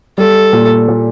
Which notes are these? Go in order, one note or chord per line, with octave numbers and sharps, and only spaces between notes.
G3 A4
A#2
A#2